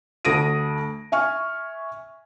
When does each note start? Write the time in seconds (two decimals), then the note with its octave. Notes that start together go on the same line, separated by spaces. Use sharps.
0.25 D2 A3 D#6 A#6 D7 D#7
1.12 E5 G#5 C#6 F6